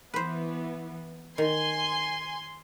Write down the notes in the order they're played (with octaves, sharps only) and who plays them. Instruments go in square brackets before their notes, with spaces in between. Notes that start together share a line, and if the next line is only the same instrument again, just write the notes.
[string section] E3 B3 [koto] B4 C5
[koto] D#3 [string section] G#5 C6